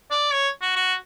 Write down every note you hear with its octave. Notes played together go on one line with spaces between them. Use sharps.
D5
C#5
F#4
F#4